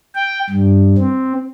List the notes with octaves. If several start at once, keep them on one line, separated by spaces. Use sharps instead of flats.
G5
G2
C4